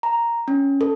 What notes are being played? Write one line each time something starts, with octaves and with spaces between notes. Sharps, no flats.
A#5
C#4
A4